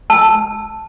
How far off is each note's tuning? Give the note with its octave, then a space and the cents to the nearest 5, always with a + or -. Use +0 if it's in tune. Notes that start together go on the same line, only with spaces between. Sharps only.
A5 +0 E6 +0